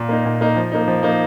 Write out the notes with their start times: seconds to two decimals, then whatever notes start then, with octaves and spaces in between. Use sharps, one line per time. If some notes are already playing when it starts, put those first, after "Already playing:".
Already playing: A#2
0.09 A#3 D#4
0.25 A#2
0.41 A#3 D#4
0.56 F3
0.72 A#3 D#4
0.88 F3
1.03 A#3 D#4